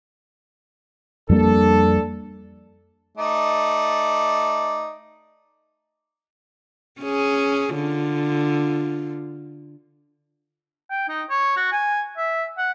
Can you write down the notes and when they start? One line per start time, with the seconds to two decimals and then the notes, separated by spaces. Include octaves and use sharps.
1.29 F2 G3 A#3 D4 A4
3.18 A3 D#4 D5
7.00 C#4 G#4
7.75 D3 F4
10.90 G5
11.08 D#4
11.30 C#5
11.57 F#4
11.72 G#5
12.17 E5
12.58 F#5